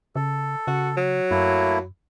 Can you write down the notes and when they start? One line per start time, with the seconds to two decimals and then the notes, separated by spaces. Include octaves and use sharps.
0.16 C#3 A4
0.67 C#3 F#4
0.97 F#3
1.31 F#2 A3 A#3 E4